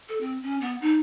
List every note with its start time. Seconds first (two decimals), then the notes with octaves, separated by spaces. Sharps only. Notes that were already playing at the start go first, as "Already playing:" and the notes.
0.09 A4
0.21 C4
0.43 C#4
0.61 B3
0.82 D#4